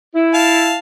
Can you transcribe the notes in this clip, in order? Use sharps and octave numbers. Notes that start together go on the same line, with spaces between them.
E4
F5 A5